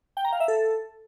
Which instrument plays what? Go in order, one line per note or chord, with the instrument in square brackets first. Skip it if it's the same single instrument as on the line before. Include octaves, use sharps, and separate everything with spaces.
[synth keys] G5
A#5
F5
E5
A4